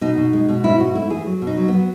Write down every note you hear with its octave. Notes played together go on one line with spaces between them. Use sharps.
B2 D#4
B2
G#3
B2
G#2 E4
G#2 F#4
A3 E4
E3 G#4
F#3
B2
D#4
F#3
F#3 B3